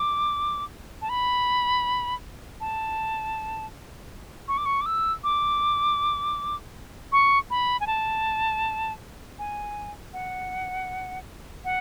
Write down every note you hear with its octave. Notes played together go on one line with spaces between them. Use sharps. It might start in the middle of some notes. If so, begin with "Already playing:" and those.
Already playing: D6
A5
B5
A5
C#6
D6
C#6
D6
E6
D6
C#6
B5
G#5
A5
G#5
F#5
F#5